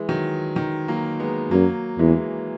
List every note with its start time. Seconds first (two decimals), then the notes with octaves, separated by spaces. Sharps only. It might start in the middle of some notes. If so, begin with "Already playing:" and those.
Already playing: E3 G#3
0.09 D#3 F#3
0.56 D#3
0.88 F#3 A#3
1.20 G#3 B3
1.51 F#2 F#3 A#3
1.99 E2 E3 G#3